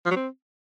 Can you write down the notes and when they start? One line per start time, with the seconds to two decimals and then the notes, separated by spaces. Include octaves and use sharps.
0.06 F3
0.11 F#3
0.16 C4